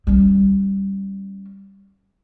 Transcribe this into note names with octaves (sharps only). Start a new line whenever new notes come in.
G3 C#4